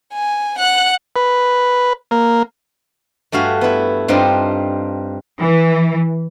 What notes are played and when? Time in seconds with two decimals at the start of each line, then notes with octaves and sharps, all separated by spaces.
0.14 G#5
0.59 F#5 F#6
1.16 B4
2.11 A#3
3.32 G2 A3 F#4 F5 G#5
3.61 B3 E4
4.08 G2 C4 D4 D#4 F4 G4
5.38 E3